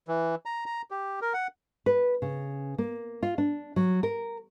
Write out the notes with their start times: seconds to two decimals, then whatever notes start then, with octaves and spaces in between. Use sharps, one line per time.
0.08 E3
0.46 A#5
0.66 A#5
0.91 G4
1.21 A#4
1.34 F#5
1.86 B4
2.22 C#3
2.78 A#3
3.23 F4
3.38 D4
3.76 F#3
4.03 A#4